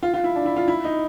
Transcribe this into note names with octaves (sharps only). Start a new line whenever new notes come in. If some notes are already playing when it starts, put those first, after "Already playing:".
F4
F4
E4
D4
E4
F4
E4
D#4